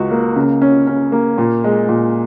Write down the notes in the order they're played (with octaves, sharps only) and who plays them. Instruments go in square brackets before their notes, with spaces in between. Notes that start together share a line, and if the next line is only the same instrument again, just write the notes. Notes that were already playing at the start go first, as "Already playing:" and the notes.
Already playing: [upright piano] C#2 F#4
A#3
C#3
C#4
C#4
A#3
A#2
G#3
A#2